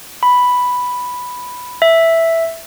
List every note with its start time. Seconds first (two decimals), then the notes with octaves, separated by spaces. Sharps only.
0.23 B5
1.82 E5